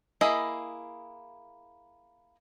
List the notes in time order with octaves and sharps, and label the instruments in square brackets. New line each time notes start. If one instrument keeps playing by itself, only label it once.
[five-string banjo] A#3 E4 G#4 D#5 B5